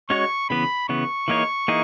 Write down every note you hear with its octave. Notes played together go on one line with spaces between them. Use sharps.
G#3 C#4 F#4 C#5 C#6
C#3 E3 B3 B5
C#3 E3 B3 C#6
E3 A#3 D#4 G#4 C#5
E3 A#3 D#4 G#4